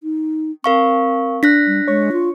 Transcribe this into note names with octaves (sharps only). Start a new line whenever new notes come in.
D#4
C4 A#4 F5 C#6
D4 F#6 A#6 B6
G3
G#3 C#5 C#6
F4